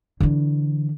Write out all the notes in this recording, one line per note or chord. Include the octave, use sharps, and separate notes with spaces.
D3 E3